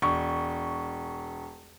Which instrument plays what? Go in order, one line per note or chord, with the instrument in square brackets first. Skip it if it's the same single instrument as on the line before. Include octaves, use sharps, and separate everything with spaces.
[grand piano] E1 C#6